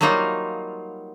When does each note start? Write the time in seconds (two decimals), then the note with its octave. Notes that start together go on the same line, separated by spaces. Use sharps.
0.01 F#3 G3 A#3 D#4 F4